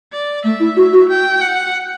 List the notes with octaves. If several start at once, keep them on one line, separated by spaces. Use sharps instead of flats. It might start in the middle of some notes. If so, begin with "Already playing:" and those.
D5
A3 E5
E4
F#4
F#4
G5
F#5